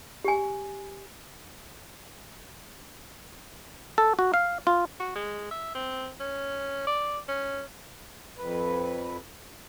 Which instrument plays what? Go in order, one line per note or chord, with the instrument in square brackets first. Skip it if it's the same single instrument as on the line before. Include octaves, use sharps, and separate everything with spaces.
[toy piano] G4 G#5
[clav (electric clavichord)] A4
F#4
F5
F4
[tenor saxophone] F#4
G#3
E5
C4
C#4
D5
C#4
[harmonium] F2 B4